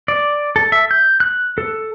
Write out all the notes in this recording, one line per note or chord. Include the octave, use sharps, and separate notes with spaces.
D5
A4
E5
G6
F#6
A4